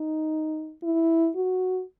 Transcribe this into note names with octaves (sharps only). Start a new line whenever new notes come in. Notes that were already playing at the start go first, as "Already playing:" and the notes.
Already playing: D#4
E4
F#4